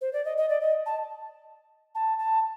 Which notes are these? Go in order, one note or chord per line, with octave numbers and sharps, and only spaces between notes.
C5
D5
D#5
D#5
D5
D#5
A5
A5
A5